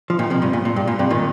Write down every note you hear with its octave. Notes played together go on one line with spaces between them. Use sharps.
F3
A#2 D#3
C3 F3
G2 C3
A#2
A#2
G2
A#2
G2 C3
A#2 D#3